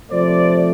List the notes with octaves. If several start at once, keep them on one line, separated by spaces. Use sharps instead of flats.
C3 F3 A3 C5 D5